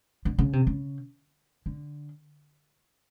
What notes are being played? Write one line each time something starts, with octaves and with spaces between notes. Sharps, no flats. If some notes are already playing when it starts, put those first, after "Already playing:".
D3
C#3
C3
C#3
D3